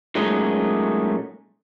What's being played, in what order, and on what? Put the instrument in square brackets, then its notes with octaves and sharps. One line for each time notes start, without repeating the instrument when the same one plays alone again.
[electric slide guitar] A#2 F#3 G#3 A3 C#4 D#4